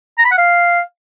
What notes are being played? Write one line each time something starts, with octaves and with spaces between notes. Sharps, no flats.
A#5
B5
F#5
F5